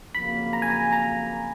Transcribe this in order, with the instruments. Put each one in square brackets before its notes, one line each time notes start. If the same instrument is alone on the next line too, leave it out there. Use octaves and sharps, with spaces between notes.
[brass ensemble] F2 C#3 F#3 A#3 [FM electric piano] B5
[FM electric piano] A#5
G#5
A#5
A#5